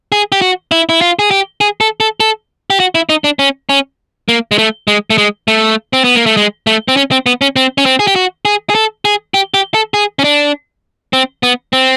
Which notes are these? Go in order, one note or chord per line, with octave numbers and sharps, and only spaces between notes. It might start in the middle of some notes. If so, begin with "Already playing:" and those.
G#4
G4
F#4
E4
E4
F4
G#4
G4
G#4
A4
A4
A4
G4
F#4
E4
D#4
D4
C#4
C#4
A#3
G#3
A3
G#3
A3
G#3
A3
C4
B3
A#3
A3
G#3
A3
C4
C#4
C4
B3
C#4
C4
C#4
C4
G#4
G4
F#4
G#4
G#4
A4
G#4
G4
G4
A4
G#4
C#4
D4
C4
B3
C4